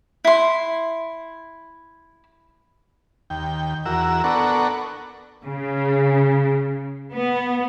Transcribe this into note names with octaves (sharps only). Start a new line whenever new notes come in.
E4 C6
D#2 G5
E2 F#4 A#4 E6
B3 D4 A4 A#4 F#5 C#6
C#3
B3